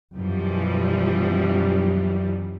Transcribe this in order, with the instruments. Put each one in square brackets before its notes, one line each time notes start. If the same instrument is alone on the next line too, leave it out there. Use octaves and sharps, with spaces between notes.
[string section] F#2 B2 E3 F3 G3